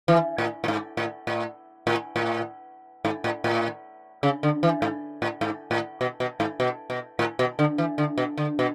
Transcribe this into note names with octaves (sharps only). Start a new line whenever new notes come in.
E3
A2
A2
G#2
A2
A2
A2
A2
G#2
A2
A2
C#3
D3
E3
G#2
A2
G#2
A2
B2
B2
G#2
B2
B2
A2
B2
D3
E3
D3
B2
D3
B2